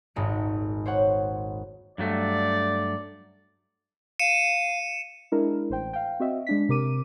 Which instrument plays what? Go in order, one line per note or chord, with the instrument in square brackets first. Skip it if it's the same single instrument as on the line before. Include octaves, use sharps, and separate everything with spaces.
[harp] D#1 G#1 G#2 G#3 C#7
C5 C#5 F#5
[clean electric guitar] G2 F#3 A3 [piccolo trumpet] D5
[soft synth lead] F5 [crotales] C#7 D#7 E7
[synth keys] G#3 D4 E4 A#4
A1 C5 G5
F5 G5
C4 F#4 D#5 E5
G#3 D4 B6
C3 A#4 D6 D#7